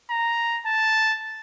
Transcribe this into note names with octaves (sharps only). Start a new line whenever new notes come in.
A#5
A5